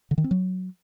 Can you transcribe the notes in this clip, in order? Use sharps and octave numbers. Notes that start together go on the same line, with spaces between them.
D3
D#3
C4
F#3